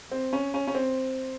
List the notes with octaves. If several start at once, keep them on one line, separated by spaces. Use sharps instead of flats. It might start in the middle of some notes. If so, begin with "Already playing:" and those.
C4
C#4
C#4
C#4
C4